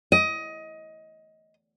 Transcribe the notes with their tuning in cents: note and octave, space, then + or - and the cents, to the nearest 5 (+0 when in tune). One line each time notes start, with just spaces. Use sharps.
D#5 +20